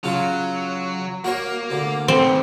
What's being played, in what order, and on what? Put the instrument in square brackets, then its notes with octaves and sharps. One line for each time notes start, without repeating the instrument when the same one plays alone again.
[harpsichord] C#3 F4 [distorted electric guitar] F#3
[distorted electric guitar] A#3 [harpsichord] F#4 A#4 C#5
[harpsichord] D2 D3
[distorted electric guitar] D#2 C#3 [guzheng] C4